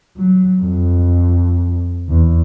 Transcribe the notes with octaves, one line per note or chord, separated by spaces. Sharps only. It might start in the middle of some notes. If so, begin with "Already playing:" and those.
F#3
F2
E2